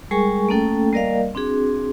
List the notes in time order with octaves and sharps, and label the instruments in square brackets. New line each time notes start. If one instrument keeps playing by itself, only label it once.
[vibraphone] G3 G#3 G#4 A#4 G#5 C#6
A3 A#3 C#4 A4 G5
G3 A#3 A#4 D5 D#5 F5
C4 D4 F#4 G#4